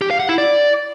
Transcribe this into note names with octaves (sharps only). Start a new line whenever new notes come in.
G4
F5
F#5
E4
D5